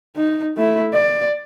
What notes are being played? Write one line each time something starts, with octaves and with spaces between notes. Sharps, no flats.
D#4
A3 E4
D5